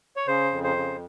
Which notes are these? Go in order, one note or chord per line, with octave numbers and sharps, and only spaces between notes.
C#5
C#3 C5
F2
C5
C#3